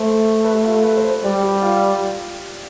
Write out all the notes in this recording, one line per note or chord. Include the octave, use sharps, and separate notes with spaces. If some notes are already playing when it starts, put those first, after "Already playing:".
Already playing: A3 C5
B4
G4
F4
A4
B4
C5
C5
G3 D5
G4
F4